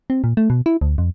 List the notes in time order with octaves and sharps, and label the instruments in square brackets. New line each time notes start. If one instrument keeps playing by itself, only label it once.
[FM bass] C4
A#2
A3
B2
E4
D2
F2